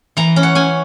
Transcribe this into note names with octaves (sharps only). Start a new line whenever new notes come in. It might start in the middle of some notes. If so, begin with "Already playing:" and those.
E3 A#5
C#4
F#5
C#4 G#5